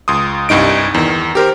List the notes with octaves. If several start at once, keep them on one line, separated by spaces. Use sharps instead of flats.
C#2 C6 D#6
C2 G2 D#4 D7
E2 D#3
G4 A#4 C5